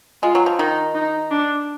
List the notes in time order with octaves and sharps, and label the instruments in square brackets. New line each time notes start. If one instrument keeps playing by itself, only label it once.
[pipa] G#3 [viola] F4
[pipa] F#3
F3
[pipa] D#3 [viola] D#4
[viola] D#4
D4